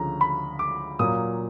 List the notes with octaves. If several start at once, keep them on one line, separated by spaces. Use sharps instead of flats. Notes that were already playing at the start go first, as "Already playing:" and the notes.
Already playing: D2 C#3 F3 A#5
B5
D6
A#2 F#3 A#3 D#6